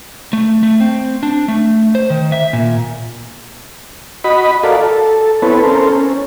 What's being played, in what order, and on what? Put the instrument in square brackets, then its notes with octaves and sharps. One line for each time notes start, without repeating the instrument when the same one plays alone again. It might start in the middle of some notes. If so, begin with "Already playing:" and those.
[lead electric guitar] A3
A3
C4
D4
A3
C5
D#3
E5
A#2
[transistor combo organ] F#4 D#5 B5
F#4 A4 A#4 D5 F5
A4
B3 C4 E4 A4 B4 C#5
C#4 A4 A#4 C5
C#4